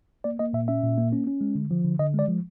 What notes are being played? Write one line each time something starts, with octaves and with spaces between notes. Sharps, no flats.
A#3 D5
A#3 D#5
A#2 E5
C#4 E5
A#2
A#3
C#4
C#4
G#3
D3
F3
D3
D3 D#5
G#3 D5
F3